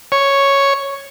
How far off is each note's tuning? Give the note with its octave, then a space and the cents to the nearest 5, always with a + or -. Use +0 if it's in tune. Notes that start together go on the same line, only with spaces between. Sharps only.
C#5 +0